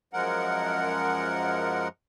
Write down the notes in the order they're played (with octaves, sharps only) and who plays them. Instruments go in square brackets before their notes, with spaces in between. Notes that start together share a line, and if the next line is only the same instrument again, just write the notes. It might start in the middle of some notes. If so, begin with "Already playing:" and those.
[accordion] F#2 F3 G#3 A#4 F#5